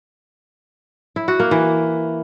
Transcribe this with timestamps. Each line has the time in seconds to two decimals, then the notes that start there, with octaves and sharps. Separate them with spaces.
1.16 E4
1.28 F#4
1.40 A#3
1.51 E3